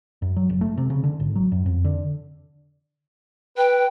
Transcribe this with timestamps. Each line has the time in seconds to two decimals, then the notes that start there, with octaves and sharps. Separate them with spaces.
0.22 F#2
0.36 F#3
0.49 F#1
0.61 A3
0.78 C3
0.90 C#3
1.04 D3
1.20 G#1
1.36 F#3
1.52 F#2
1.66 F2
1.85 D3
3.58 B4 G5